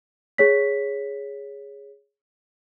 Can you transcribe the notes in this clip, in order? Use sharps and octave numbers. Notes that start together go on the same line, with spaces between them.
G#4 C#5 B6